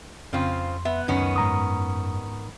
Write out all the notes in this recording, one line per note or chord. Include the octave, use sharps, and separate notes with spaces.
F2 C#3 C4 F4 C6
B3 E5
C#2 F#2 D#3 B3 C#4
G#2 A#5 D#6